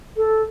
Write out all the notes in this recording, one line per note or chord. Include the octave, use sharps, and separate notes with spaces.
A4